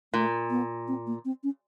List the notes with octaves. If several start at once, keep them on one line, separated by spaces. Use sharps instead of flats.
A#2 A3
B3
C4
A#3
C4
C#4